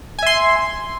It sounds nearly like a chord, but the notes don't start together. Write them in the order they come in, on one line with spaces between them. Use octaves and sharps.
G#5 E5 C6